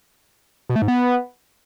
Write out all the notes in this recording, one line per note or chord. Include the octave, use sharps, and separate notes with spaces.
B2
A3
G#2
B3